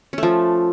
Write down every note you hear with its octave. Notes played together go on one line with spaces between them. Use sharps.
F3 A3 C#4